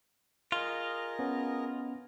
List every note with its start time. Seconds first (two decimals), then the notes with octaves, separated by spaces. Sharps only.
0.52 F4 G#4 A#4 D#5
1.19 B3 C#4